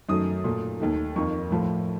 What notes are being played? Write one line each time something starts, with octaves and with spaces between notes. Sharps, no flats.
F#2 D#3 F#3 A3 D#6
A#2 A3
D#2 D#3 A3
F2 D#3 A#3 C#6
A2 F3 A3